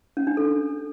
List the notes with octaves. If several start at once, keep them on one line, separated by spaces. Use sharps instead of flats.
C#4
D4
A4